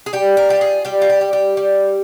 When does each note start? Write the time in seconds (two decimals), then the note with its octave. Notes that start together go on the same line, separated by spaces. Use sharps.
0.06 G#4
0.13 G3 G4
0.37 A#4
0.49 F4 G4
0.61 G#4
0.85 G3 G4
1.02 F4
1.10 G4
1.21 G3
1.33 G4
1.57 G3